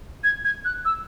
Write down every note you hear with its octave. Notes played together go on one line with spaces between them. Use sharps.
G#6
G#6
F#6
E6